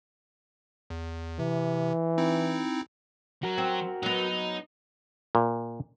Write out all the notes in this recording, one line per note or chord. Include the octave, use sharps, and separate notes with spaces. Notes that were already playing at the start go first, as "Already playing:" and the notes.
E2
C3 E3
C4 D#4 E4
F#3 F#4 A#4
C4
F#3 B3 D#4
A#2